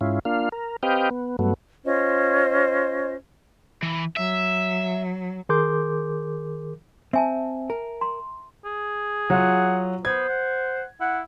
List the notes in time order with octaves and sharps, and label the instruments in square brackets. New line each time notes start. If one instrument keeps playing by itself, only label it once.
[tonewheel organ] G#2 C#4 E4 F4
A#3 D4 F4 F5
A#4
C4 G4 B4 D#5 F5 G5
B3
G2 F#3 A3 B3
[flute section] C#4 F4 C5 D#5
[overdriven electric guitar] E3
[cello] F#3 [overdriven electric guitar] E5
[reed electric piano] D#3 G#4 A#4 C6 D6 G6
[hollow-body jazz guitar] C4 [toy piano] E5 G#5 A5
[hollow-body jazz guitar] A#4
[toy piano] A#5 C6
[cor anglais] G#4
[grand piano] F#3 F4 [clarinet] F#5
[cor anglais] B3 [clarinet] C5 [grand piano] G#6
[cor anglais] F#5
[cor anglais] E4 [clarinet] F#5